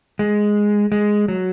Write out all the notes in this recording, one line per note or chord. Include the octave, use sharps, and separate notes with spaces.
G#3
G#3
F#3